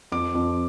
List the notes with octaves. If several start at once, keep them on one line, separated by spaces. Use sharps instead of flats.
F2 D6
F2